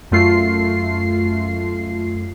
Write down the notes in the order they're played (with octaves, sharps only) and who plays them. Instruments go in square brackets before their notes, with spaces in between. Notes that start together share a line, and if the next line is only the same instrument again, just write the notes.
[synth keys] F#2 A3 F4 C7